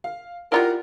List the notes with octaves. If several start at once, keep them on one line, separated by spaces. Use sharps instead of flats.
F5
E4 F4 G4 A#4 D5 F#5 A#5